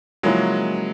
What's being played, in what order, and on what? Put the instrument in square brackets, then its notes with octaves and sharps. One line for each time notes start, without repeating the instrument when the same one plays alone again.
[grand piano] C#3 F3 A#3 C#4 E4 [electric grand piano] F#3 G#3